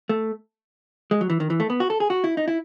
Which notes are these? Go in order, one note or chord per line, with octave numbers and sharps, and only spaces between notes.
A3
G#3
F#3
E3
D#3
E3
A3
B3
F#4
A4
G#4
F#4
E4
D#4
E4